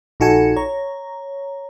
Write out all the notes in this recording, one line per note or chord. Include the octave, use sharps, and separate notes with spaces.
A#1 D#4 F#4 A4 G#5 C#7
C#5 A#5